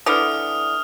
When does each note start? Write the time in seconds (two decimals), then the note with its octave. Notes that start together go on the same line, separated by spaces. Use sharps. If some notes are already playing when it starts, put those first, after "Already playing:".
0.06 D3 E3 D#6 F6